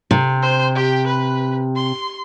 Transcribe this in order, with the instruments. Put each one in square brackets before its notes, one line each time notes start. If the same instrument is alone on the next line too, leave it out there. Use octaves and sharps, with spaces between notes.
[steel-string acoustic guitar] C3
[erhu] C5
G4
B4
C6